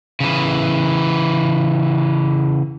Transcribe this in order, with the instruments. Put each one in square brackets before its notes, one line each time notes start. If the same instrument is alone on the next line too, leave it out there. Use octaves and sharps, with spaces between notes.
[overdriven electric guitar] C#3 E3